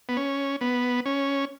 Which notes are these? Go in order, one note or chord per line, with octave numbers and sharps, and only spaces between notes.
B3
C#4
B3
C#4